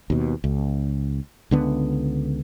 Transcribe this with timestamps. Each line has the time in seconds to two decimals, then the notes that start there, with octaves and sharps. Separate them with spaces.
0.10 D#2 B2
0.44 C#2
1.51 C#2 D3 B3